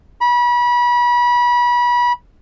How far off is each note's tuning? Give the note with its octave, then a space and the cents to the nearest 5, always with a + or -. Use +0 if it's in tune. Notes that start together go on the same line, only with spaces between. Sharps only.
B5 -30